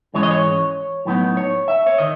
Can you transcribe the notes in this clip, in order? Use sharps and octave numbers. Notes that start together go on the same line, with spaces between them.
G#2 E3 G#3 C#4 C#5
D#5
C#5
A2 F#3 B3 D#4
C#5
E5
C#5
D#3 D#5